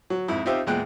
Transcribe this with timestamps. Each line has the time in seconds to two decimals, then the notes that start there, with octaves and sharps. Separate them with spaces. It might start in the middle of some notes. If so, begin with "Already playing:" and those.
0.10 F#3
0.28 F2 G#2 E4
0.45 C4 D#4 F4 G4 C5 E5
0.67 E2 A#2 G#3 G5 F#6